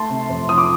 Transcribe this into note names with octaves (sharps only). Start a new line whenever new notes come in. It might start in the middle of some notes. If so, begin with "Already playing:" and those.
Already playing: A3 A5 C6
C3
F2
F3 D#6
D6